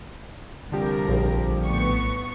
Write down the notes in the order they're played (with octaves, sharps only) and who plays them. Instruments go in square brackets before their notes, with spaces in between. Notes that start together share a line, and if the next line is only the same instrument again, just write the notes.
[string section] C2 A#4 [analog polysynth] D3 F3 G4
[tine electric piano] A#1
[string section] A2 B3 C#6